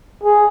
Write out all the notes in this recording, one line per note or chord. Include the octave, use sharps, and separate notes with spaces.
G#4